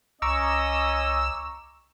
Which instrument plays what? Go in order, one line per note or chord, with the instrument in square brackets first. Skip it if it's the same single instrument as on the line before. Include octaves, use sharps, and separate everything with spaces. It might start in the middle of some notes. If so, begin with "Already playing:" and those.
[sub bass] C2 [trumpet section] C#4 D#5 [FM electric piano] A#5 C#6 D6 [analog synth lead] E6